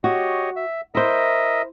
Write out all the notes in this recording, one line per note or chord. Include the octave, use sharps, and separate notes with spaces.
F#4 G4 C#5 D#5
E5
E4 A#4 C5 D#5 E5